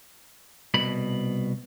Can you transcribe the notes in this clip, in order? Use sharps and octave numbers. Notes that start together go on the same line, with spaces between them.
C2 B2 B5